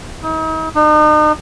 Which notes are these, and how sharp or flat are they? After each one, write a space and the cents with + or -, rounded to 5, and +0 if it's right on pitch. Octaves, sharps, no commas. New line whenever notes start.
D#4 +40
D#4 -40